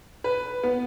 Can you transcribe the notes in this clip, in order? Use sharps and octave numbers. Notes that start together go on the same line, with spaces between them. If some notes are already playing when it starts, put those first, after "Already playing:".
B4
B3